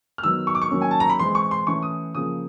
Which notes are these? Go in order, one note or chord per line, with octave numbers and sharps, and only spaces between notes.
F6
D#3 F#3 B3 E6
C#6
D6
C#6
D#3 F#3 A#3 C#4
G#5
A5
A#5
B5
E3 G#3 C4 C6
C#6
C6
E3 A3 C#4 C#6
D#6
C#3 F3 A#3 D#6